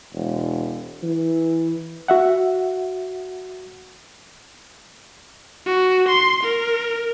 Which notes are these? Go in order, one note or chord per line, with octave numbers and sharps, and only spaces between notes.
E1
E3
F#4 E5 F#5
F#4
C6
A#4